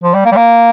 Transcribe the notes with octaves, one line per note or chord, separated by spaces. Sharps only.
F3
G3
A#3
G3
A#3